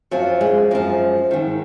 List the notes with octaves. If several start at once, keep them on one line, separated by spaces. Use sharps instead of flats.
F#2 F3 F#3
G#3
F#2 F3 G#3
G#2 D#3